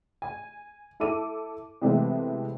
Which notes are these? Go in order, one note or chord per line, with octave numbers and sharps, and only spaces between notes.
G#5
E4 A4 D6 D#7
C3 E3 G#3 A3 B3 C4